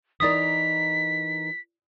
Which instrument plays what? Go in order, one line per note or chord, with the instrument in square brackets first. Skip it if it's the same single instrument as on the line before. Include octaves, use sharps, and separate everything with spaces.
[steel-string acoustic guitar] E3 D#4 A#4 [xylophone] D5 D#6 [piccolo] B6